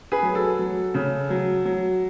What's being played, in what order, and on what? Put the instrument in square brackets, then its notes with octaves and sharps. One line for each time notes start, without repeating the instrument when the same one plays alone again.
[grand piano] G#4 B4
F#3
A4
F#3
C#3
F#3
F#3